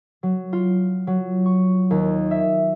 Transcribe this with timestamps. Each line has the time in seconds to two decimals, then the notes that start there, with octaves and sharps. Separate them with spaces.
0.23 F#3
0.53 F4
1.07 F#3
1.46 C#6
1.90 D#2
2.31 E5